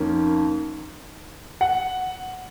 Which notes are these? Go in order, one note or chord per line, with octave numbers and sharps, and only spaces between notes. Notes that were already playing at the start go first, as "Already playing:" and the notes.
Already playing: F2 D#3 A#3 C#4
F#5